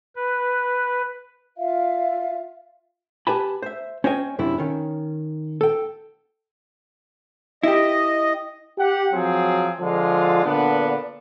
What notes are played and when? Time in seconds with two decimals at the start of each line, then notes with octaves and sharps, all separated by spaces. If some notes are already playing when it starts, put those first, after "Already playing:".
0.16 B4
1.57 F4 E5 F5
3.27 G4 B4 G#5 A5 B5
3.62 C5 E5
4.04 C#4 C5 C#5 D#5 G5 G#5
4.39 F#2 C3 D4 E4
4.58 D#3 C#4
5.61 A4 G5
7.63 E4 G4 D#5
8.79 G4 F#5
9.14 F3 F#3 C4 G#4
9.80 D3 F3 G#3 F4
10.44 A#2 D3 B3 D4